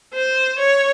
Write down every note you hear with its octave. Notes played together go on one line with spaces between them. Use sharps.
C5
C#5